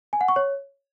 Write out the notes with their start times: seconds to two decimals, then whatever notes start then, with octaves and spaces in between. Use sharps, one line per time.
0.13 G#5
0.21 F#5
0.28 C#6
0.36 C#5